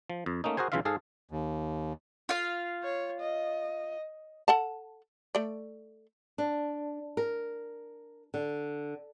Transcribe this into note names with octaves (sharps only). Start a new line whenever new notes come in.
F3
F2
A3 A#3 C#4 D#4
F#4 G#4 A#4 C5 G#5
B1 C#3 E3 F4 E5 F5
G#2 G#4 A4 F5
D#2
F4 F5
C#5
D#5
A4 F#5 A5
A3 D5
D4
A#4
D3